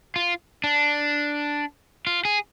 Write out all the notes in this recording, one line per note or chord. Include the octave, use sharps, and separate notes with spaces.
F4
D4
F4
G#4